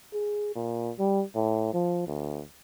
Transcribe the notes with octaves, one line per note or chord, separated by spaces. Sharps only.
G#4
A#2
G3
A2
F3
D2